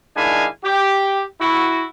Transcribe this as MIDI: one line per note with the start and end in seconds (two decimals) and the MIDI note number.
0.16 0.46 51
0.16 0.46 56
0.16 0.46 62
0.16 0.46 64
0.16 0.46 77
0.16 0.46 80
0.64 1.23 67
1.40 1.83 64
1.40 1.83 66